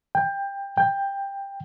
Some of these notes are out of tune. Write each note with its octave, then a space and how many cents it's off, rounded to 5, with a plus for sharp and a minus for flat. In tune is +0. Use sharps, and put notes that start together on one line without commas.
G5 +20
G5 +15